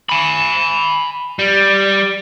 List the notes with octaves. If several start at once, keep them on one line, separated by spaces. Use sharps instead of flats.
G#5 B5
G3